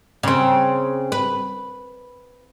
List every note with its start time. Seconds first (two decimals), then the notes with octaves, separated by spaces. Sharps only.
0.23 C#3 C4
1.12 B4